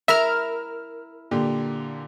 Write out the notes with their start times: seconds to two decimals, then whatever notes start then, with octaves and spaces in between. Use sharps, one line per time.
0.08 E4 A#4 E5 F6
1.31 A#2 D3 G4